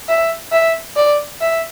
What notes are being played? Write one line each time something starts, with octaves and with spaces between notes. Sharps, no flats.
E5
E5
D5
E5